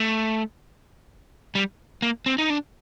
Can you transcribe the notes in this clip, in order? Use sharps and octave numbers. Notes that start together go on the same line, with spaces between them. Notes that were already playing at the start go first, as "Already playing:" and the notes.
Already playing: A3
G3
A#3
C4
D#4
D4